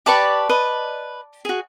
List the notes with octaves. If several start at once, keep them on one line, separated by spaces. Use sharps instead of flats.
G4 B4 D5 A5 C#6 D6
B4 D#5
F#4 G#4